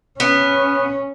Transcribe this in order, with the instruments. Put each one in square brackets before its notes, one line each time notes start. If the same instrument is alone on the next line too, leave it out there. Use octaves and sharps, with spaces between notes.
[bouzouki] B3 [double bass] C#4